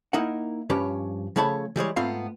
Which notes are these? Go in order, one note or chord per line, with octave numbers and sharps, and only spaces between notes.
A#3 D#4 E4 A#4 F#5
G2 F3 C#4 G4 B4 C#5
C#3 F3 A3 C#5 A5 B5
E3 G3 G#3 C#5
G#2 A3 B3 C4 F4 F5